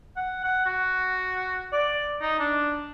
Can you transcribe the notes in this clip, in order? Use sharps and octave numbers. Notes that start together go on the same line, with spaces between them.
F#5
F#5
F#4
D5
D#4
D4